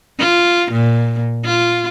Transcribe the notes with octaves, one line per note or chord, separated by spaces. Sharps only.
F4
A#2
F4